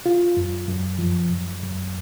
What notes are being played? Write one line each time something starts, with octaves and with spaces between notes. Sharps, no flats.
F4
F#2
F#2
F3
F#2
F#2